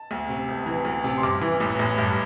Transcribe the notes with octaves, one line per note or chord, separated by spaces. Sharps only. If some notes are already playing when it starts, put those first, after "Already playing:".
Already playing: A5
D2
C3
E1
E3
D2
C3
C6
G2 D6
E3
A1
A1
G2 A5